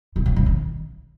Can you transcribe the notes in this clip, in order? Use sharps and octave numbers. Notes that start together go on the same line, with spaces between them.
C3
C#3
C#3
D#3